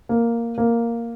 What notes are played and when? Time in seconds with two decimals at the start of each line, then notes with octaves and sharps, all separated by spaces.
0.09 A#3
0.58 A#3